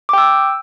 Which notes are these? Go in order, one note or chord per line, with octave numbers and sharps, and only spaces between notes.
G5 D6 E6